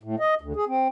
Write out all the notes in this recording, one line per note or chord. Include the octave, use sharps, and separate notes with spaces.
A2
D#5
D2
G#4
C4